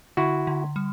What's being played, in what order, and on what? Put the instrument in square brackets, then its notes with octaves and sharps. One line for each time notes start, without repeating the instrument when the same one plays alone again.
[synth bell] D3 [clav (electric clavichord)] E4 F#4
[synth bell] D3
G3